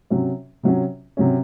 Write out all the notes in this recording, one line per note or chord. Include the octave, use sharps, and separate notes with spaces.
C3 F#3 C#4
C3 F#3 C#4
C3 F#3 C#4